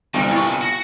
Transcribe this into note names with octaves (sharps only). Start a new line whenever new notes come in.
G1 C2 F3 G3
E4 B4 C#5 D#5 C#6
F#4